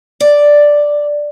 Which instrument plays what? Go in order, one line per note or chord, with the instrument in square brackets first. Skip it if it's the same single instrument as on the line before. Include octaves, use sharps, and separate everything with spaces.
[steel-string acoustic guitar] D5